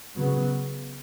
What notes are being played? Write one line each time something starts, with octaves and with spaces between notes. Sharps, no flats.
C#3 F#3 B3